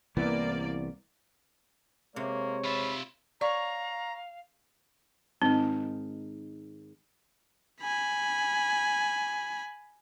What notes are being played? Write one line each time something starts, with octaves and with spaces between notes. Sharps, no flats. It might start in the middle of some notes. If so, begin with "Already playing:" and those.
C2 E3 A#3 B3 D5
C3 G#3 A#3 C5 C#5
F4 E5 B5
C#5 D5 F5 A#5
G#2 D#3 C4
G#5 B5